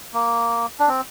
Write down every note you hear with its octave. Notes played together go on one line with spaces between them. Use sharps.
A#3
D4
C4